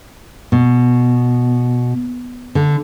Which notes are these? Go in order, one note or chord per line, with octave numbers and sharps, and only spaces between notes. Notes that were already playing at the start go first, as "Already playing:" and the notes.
B2
D3